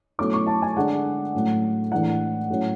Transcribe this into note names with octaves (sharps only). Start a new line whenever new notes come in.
B2 F#3 A3 C#4 E4 D6
C#6
A5
G#5
D3 G#3 D4 F#5
A2 F#3 A3 C#4
A2 E3 G#3 D4 F#5
A2 F#3 C#4